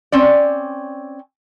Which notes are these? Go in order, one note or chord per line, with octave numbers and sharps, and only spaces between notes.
C4 C#4 D5